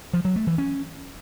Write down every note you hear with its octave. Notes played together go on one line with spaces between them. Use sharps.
F3
F#3
A3
E3
C#4